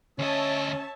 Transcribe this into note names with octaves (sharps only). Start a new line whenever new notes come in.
D2 C#4 C#5 D#5 E5 A5